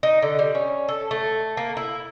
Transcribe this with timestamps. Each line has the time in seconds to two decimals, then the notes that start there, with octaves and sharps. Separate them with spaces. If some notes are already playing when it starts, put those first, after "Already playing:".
0.03 D#4
0.22 D3
0.39 G3
0.55 C#4
0.89 A4
1.11 A3
1.57 A#3
1.77 E4